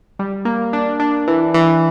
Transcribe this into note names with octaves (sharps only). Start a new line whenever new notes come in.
G3
A#3
D4
D4
E3
E3